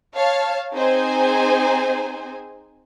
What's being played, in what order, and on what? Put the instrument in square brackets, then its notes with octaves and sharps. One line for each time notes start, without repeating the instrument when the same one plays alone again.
[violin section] C#5 F5 A5
C4 D#4 G#4 C5 G#5